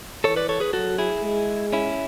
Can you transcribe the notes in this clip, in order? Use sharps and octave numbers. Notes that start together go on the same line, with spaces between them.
E3 A4 C#5
B4 D5
A4 C#5
G#4 B4
F#3 F#4 A4
E4 G#4
G#3
C#4 E4